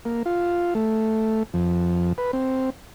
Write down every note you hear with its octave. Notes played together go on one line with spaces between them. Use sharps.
A#3
F4
A3
F2
B4
C4